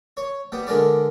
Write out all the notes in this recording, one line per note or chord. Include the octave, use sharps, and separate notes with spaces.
C#5
G3 B3
D3 G#3 A#4 B4 D5